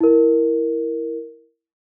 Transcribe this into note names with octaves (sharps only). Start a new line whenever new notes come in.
E4 A#4